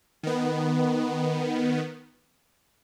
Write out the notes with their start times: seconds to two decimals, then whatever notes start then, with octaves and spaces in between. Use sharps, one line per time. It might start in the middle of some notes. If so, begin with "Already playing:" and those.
0.23 D#3 B3